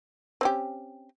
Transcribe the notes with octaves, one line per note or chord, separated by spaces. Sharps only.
C4 C#4 G4